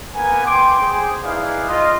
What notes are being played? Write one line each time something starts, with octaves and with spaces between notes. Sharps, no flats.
A#3 B3 A#4 B4 G#5
G5 C6 D6
G#4 C5
D#4 E4 G#4 B4 D5 F5
F4 D#5